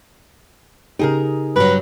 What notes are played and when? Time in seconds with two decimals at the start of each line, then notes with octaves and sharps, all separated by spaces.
0.99 C#3 D#4 G4 G#4 A#4
1.56 G2 F#3 B4